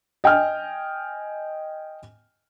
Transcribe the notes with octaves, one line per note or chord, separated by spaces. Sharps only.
D#5 G5 G#5 F6